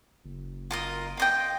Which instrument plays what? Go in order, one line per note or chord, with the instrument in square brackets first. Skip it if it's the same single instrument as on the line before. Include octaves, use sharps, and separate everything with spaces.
[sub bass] F#1
[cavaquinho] F4 A#4 D#5
F4 D#5 G5